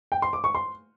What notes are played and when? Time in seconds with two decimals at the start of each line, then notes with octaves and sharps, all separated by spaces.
0.12 G5
0.22 C6
0.33 D6
0.44 C#6
0.55 C6